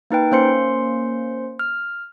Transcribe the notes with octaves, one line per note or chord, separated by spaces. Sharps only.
A#3 D#4 B4 G5
A#3 C#4 C5 C6 C#7
F6